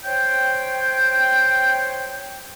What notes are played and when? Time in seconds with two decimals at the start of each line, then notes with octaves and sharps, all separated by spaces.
0.05 C5 C#5 G5